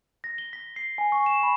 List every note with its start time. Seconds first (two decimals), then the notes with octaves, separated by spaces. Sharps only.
0.24 A#6
0.38 G7
0.53 B6
0.76 C7
0.98 G#5
1.12 C#6
1.26 E7
1.43 B5